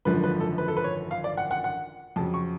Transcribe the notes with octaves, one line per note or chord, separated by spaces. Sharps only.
G#1 F#2 D3 F3 B4
B4
A4
B4
A4
B4
C#5
F5
D5
F#5
F#5
F#5
F2 C#3 F#3 A5
C#6